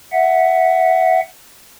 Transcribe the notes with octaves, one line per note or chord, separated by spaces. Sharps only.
E5 F#5